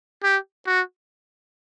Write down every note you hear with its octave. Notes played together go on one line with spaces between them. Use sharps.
G4
F#4